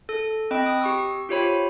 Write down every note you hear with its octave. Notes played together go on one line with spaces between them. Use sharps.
A4
C4 D#5 G5 B5
D#6
G4 C#6 E6
F4 G4 C5 C#5 B5